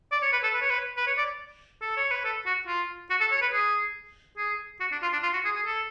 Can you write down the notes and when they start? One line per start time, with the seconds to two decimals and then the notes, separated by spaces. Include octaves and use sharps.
0.12 D5
0.22 C#5
0.32 B4
0.43 A4
0.54 B4
0.61 C#5
0.70 B4
0.97 B4
1.07 C#5
1.18 D5
1.81 A4
1.97 C#5
2.11 B4
2.25 A4
2.46 F#4
2.67 F4
3.10 F#4
3.21 A4
3.31 C#5
3.41 B4
3.53 G#4
4.37 G#4
4.80 F#4
4.92 D4
5.02 F4
5.13 D4
5.23 F4
5.33 F#4
5.45 G#4
5.56 G#4
5.66 A4